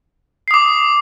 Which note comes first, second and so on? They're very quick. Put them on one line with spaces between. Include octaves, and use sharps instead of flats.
C7 D#6 D6